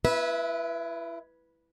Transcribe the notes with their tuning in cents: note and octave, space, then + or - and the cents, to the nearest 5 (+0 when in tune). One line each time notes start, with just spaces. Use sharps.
E4 +30 B4 -10 E5 -20